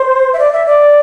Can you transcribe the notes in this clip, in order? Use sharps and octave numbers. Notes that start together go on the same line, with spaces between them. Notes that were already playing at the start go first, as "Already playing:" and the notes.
Already playing: C5
E5
D5
E5
D5